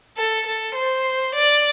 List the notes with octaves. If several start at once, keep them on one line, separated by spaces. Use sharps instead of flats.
A4
A4
C5
D5